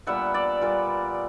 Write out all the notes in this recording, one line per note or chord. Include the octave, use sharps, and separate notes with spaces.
A#2 G3 B3 E5 F#5
D5 E5
A#2 G3 B3